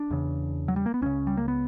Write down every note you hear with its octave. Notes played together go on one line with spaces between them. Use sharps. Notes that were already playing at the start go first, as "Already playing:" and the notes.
Already playing: D4
E2 C#3
F#3
G3
A#3
B3
C#2 C#3 C#4
G3
A#3
B3